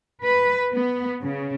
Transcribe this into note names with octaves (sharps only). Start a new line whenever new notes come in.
B4
B3
C#3